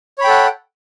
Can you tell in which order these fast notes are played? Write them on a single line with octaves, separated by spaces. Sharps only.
C#5 B5 G5 A4 F#5